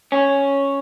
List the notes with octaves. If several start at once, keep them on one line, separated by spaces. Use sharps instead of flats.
C#4